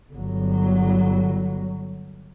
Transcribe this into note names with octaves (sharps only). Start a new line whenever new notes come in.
G1 F#3